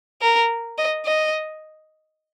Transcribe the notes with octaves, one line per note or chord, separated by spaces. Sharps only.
A#4
D#5
D#5